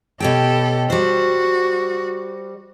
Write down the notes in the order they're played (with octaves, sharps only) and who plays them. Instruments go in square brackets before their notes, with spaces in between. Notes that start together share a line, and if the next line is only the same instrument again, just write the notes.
[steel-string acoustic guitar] B2 C#5 G5 [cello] G4 A4
[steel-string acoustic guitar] G3 C5 [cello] F#4